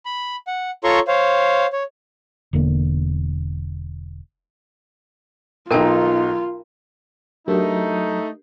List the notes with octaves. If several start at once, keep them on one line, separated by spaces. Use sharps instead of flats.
B5
F#5
F4 A4 C#5 A#5 C6 C#6
C5 C#5 F5
C#5
E1 E2 D3 A#3
B1 D#4 F4 A#4 G5 A5
F#3 A3 D4 D#4 G4 A#4